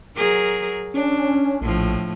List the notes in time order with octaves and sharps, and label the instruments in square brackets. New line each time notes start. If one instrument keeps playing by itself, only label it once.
[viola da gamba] F#3 G#4 A#4
[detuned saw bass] C#4 [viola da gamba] D4
[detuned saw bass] A#1 [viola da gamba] A2 F3